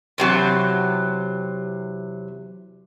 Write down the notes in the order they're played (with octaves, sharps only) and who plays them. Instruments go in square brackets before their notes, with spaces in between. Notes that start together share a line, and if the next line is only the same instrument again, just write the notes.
[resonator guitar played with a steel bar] E2 C3 F#3